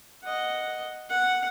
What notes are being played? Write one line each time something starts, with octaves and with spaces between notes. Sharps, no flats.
D#5 F#5
F#5